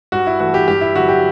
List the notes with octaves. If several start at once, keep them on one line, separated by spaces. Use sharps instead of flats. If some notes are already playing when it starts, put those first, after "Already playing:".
G2 F#4
E4
E3 A3 F#4
G4
G2 G4
E4
D3 F#3 F#4
G4